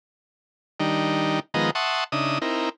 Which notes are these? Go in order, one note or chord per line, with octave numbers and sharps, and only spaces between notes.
D#3 G3 D4 D#4
D#3 F3 G#3 B3 D#5 A#5
E5 F#5 A5 C6 C#6 D#6
C#3 D4 D#4 E5 D#6
C4 D#4 E4 A#4